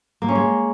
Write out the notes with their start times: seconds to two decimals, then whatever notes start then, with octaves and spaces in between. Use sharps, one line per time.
0.22 A#3
0.28 C#4
0.35 G#3